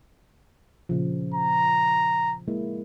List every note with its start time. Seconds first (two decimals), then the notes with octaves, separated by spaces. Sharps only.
0.89 A#2 C#3 F3
1.34 A#5
2.48 G#3 A#3 E4